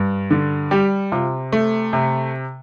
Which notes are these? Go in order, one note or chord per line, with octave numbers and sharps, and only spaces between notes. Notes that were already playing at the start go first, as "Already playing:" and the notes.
Already playing: G2
D3
G3 G4
C3 F4
A3
C3